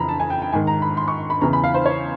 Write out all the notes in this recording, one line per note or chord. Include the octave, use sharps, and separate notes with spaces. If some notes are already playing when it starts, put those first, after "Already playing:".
Already playing: F2 C#3 E3 A#5 B5
A5
G#5
G5
G5
G#2 D#3 G#5
A#5
B5
C6
C#6
B5
E2 C#3 E3 A#5
B5
F5
C5
C#5